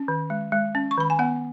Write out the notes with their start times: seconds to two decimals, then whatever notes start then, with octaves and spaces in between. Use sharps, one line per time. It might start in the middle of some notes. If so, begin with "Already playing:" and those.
Already playing: C#4
0.08 D#3
0.30 G#3
0.52 G#3
0.75 C#4
0.91 C#6
0.98 D#3 B5
1.10 G#5
1.19 B3 F#5